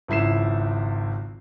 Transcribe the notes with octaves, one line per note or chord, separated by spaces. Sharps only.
G#1 C#2 E4 C7 E7